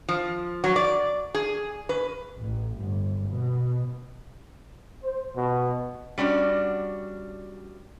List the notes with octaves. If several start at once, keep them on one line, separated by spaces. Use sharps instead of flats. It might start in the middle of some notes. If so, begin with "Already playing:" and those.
F3
F#3
D5
G#4
B4
A1
G1
B2
C5
B2
G3 C#4 D4 F#4